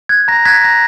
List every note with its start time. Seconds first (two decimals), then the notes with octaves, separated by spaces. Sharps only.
0.09 F#6 G#6
0.28 A#5 A#6
0.45 F#6 G#6 B6
0.64 A#5 A#6